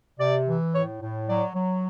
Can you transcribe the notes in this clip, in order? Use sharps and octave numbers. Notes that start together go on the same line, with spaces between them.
C3 D5
E3
A2 C#5
A2
F#3 D5
F#3